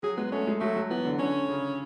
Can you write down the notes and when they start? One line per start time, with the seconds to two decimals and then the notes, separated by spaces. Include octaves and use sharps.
0.03 F#3 G#4
0.17 G#3 B3
0.32 A3 C#4
0.47 G#3
0.60 F#3 A3
0.76 F#3
0.90 E3 B3
1.05 D3
1.19 D3 C#4
1.48 C#3